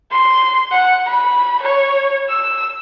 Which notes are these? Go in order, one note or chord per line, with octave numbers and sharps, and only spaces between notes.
C6
F#5
B5
C#5
E6